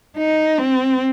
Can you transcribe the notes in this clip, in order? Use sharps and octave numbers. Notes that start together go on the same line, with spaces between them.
D#4
C4